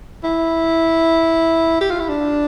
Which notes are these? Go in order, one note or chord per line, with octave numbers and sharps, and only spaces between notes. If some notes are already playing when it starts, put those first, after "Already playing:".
E4
G4
F4
E4
D4